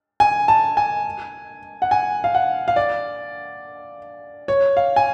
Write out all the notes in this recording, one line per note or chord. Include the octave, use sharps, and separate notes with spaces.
G#5
A5
G#5
F#5
G#5
F5
F#5
F5
D5
C#5
F5
G#5